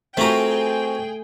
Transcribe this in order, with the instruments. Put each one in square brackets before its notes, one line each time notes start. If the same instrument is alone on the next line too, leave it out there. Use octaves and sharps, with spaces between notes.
[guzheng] A3 A#5 [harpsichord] C4 F4 F#4 [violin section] G#4 G5